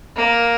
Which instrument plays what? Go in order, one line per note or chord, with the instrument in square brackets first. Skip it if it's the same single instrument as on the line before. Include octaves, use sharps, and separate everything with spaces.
[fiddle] A#3